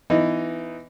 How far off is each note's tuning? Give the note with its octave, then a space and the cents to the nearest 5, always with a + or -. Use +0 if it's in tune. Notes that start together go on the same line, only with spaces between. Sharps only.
E3 +10 B3 +15 D#4 +0